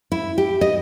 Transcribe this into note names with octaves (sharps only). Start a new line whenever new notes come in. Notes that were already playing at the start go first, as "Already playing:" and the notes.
E4
G4
D#5